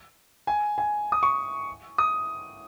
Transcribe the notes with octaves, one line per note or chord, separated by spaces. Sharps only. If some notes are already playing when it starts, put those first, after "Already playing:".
G#5
G#5
D#6
C#6
D#6